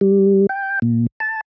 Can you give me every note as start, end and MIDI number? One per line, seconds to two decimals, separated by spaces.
0.01 0.46 55
0.49 0.79 79
0.82 1.07 46
1.20 1.41 81